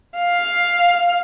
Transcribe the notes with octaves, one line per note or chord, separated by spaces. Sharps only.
F5